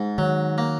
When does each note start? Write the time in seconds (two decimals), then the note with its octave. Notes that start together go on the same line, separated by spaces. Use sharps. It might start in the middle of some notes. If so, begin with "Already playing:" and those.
Already playing: G#2
0.18 D#3 F#3
0.58 A#3